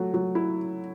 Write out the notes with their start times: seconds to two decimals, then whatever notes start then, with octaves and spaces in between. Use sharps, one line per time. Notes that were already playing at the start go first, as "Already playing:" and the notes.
Already playing: F#3 A3
0.14 F#3
0.35 E4